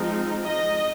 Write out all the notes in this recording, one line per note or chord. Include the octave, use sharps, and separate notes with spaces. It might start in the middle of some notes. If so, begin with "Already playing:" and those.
Already playing: F3 G#3 C4 D#4
D#5